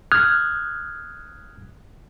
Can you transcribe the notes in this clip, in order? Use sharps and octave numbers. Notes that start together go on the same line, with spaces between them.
D#6 F6 F#6 G#6